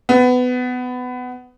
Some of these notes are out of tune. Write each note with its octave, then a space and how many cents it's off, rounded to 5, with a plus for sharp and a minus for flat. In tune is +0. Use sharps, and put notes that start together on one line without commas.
B3 +20